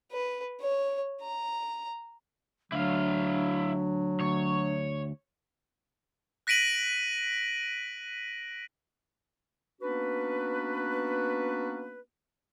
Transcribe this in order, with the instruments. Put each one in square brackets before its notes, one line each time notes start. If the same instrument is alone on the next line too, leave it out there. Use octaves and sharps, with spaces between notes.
[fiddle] B4
C#5
A#5
[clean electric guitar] D2 [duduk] F#3 [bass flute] D4 [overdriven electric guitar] E4 F5
[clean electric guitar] D2 [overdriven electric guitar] C#5
[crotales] F#6 A#6 B6 D7 D#7 F#7
[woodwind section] A#3 B3 C#4 D4 F#4 B4